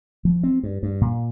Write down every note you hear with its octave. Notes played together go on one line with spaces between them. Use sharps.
F3
C4
G2
G2
A#2